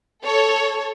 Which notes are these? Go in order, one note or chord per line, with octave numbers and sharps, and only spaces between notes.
A4 C#5